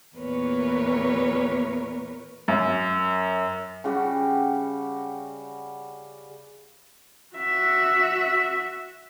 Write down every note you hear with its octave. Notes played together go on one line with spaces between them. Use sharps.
E2 A#2 A#4 B4 C#5
F#2
C#3 G3 F#4 G4
F#4 E5